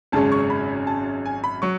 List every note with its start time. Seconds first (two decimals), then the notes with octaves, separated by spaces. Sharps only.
0.12 G#1 F#2 C#3 G#3 C#4 A5
0.32 C#6
0.50 B5
0.87 A5
1.26 G#5
1.44 B5
1.62 F#3 C#6